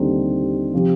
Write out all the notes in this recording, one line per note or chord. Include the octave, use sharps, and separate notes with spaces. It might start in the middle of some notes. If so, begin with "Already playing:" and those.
Already playing: D#2 D3 G3 C4 D#4
C3 F3 C4 G4